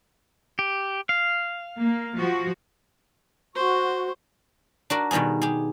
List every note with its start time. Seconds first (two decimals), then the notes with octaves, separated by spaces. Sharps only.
0.59 G4
1.09 F5
1.79 A#3
2.18 F3 F#4
3.55 F#4 C5 C#6
4.90 D4 F#4 A#4
5.11 B2 D#3 G3 B3 G#4
5.42 G4 G#4